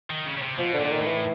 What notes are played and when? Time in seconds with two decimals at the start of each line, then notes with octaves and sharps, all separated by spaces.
0.10 D#3
0.26 C#3
0.37 C#3
0.42 C3
0.58 B2 F3
0.74 D3
0.79 A#2
0.85 D3
0.91 D#3
1.01 A2
1.06 E3